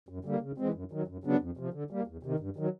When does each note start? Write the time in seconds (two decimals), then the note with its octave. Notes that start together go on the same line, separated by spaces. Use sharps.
0.09 F#2
0.25 D3 G3 A#3
0.42 C#3
0.58 E3 G#3 C4
0.74 F#2
0.92 D#3 F#3
1.07 F#2
1.24 C#3 F#3 B3 D4
1.41 F2
1.57 C3 F3
1.74 D3
1.91 G3 A#3
2.07 E2
2.23 C3 D#3
2.40 G2
2.56 D#3 F#3